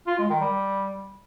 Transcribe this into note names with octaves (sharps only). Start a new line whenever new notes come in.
F4
G#3
D#3
G3